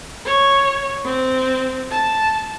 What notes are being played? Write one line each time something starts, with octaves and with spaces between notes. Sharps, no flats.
C#5
C4
A5